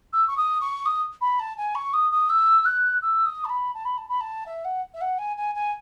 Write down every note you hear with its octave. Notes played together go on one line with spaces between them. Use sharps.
E6
C#6
D#6
C#6
D#6
B5
A5
G#5
C#6
D#6
D#6
E6
F#6
E6
D#6
A5
B5
A5
B5
A5
B5
A5
E5
F#5
E5
F#5
G#5
G#5
G#5